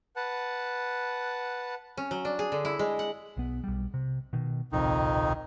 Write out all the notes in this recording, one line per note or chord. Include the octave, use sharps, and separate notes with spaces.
B4 F#5 A5
C#4
F#3
D4
G#4
D3
E4
G#3
F#5
B1 B3
B1 G3
C3
B2 D#3
D1 A#1 F2 C3 D#3 D#4